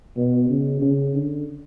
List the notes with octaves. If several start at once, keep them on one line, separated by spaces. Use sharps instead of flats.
B2
C#3
C#3
D3